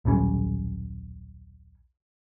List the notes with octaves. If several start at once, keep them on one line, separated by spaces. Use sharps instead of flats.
D#1 B1 G3 C#4